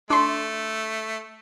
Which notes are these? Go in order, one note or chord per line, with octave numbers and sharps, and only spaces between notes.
A3 D4 C6